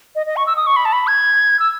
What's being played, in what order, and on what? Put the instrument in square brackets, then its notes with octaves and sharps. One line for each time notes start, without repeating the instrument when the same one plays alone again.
[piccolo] D#5
D#5
C#6
E6
D#6
C#6
B5
A5
B5
G#6
E6